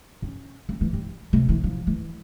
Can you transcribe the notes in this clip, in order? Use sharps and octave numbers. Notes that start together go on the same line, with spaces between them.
C#4
C4
E3
G3
C3
E3
F3
E3